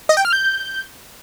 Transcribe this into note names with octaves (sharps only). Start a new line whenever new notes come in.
D#5
G5
F6
G6